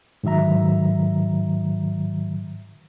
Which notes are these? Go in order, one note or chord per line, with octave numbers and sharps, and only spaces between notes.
G#2 D#3 F#3 E5 A#5